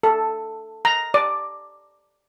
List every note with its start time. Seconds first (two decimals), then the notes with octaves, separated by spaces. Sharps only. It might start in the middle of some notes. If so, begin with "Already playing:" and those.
0.03 A4
0.85 A#5
1.14 D5